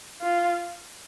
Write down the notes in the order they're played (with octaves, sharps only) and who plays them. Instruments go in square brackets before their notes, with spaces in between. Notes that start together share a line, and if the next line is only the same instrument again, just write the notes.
[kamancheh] F4